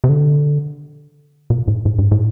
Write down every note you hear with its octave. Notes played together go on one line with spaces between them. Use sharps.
C3
D3
B2
A2
A2
G#2
A2